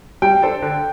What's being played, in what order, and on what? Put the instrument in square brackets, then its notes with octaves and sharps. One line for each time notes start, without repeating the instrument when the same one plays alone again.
[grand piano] G3 [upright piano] G5
[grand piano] D4 A4 C5
D3